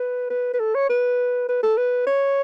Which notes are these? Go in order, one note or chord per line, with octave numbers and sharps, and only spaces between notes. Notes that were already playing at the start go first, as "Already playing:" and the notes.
Already playing: B4
B4
B4
A4
C#5
B4
B4
A4
B4
C#5